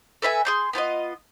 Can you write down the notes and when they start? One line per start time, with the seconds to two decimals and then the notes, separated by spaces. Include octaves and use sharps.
0.22 A4 B4 E5 G#5
0.45 G#4 C6 G6
0.73 B3 F4 C5 D#5